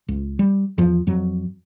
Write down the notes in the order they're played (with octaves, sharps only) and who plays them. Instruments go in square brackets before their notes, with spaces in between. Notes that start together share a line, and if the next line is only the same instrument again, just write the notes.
[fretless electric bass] C#2
G3
E2 F3
F2 F#3